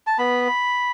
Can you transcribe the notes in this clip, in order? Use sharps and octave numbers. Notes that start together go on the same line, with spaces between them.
A5
B3 B5